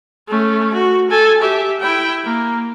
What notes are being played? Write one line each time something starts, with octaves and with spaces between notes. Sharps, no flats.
A3 C#4
F#4
A4 G#5
G4 E5
E4 G5
A#3